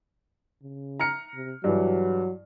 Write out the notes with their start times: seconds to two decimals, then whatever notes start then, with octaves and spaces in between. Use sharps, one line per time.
0.62 C#3
1.00 A#5 F6 C#7
1.34 C3
1.64 G2 E3 F#3